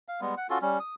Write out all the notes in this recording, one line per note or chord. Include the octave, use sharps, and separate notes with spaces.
F5
G3 G#3 B3
F#5
C#4 F4 F#4 A4
G3 C#4
D#6